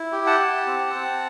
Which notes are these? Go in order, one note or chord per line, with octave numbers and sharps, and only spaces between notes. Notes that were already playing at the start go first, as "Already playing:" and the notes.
Already playing: E4
G4
F#5 A5
G4
C4
C4